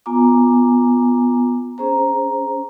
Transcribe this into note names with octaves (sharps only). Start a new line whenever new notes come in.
B3 F4 G#5 A#5 D6
C#4 G#4 C5 A#5